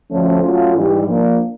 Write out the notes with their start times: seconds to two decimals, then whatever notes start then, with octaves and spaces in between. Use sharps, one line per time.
0.10 D2 D3 F3 A3 C#4
0.41 F#3 A3 C#4 F4
0.74 G#2 E3 G3
1.05 F3 A#3 D4